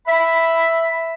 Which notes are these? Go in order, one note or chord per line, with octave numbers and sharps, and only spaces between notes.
E5 B5